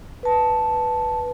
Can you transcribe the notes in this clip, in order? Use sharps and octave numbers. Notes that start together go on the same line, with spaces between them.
B4 A5